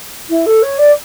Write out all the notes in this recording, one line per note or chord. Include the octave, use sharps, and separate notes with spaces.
E4
A4
C#5
D5